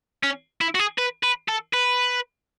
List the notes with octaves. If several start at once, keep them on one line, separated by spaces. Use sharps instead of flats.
C#4
E4
F#4
G#4
B4
B4
A4
B4